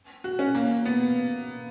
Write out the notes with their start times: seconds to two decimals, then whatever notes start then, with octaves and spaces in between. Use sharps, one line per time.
0.24 F#4
0.39 C#4
0.55 A#3
0.85 B3